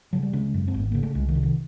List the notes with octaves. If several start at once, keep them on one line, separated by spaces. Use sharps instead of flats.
C#3 F#3
G3
C#3 G#3
F#2
C4
G#1
B3
C#3 A#3
A3
C2 G#3
D#3
C3
D#3